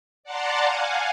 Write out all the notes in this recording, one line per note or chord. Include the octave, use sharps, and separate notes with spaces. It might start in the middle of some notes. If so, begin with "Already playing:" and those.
D5 F#5 A5 A#5 C6 D6
F5 F#5 G#5